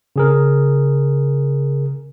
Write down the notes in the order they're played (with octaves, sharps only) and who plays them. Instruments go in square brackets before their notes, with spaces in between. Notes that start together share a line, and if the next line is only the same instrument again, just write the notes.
[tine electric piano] C#3 G#4 A#4